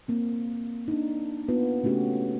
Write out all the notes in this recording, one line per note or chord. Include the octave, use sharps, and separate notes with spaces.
A#3 C4
D4 D#4
A#3 B3 F4
C#3 A3 C#4 F#4 G4